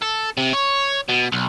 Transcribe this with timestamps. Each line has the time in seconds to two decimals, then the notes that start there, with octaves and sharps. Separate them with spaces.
0.02 A4
0.37 C3
0.53 C#5
1.09 B2
1.32 B1